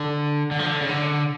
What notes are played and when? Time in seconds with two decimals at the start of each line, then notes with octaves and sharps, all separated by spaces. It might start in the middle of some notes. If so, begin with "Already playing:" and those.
Already playing: D3
0.51 D3
0.59 F3
0.67 D3
0.81 C#3
0.89 D3